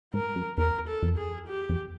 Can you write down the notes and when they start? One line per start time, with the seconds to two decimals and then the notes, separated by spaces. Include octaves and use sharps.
0.14 G#2 A#4
0.36 F#2
0.58 E2 A#4
0.88 A4
1.02 F2
1.18 G#4
1.47 G4
1.69 F2